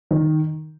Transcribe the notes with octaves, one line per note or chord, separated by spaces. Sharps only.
D#3